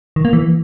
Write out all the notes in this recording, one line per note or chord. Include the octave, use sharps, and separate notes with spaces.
D#3
A#3
E3